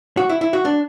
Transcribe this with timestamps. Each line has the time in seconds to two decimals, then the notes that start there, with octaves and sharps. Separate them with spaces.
0.17 F#4
0.29 E4
0.41 E4
0.53 F#4
0.65 D4